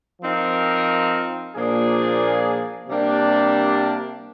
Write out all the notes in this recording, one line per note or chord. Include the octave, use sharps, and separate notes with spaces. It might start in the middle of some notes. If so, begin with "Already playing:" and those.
F3 C4 D#4 A#4
A#2 F3 A#3 D4 G#4
C3 G3 A#3 D4 G4